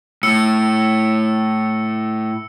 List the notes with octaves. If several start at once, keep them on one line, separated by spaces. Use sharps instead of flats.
A2 E6 C#7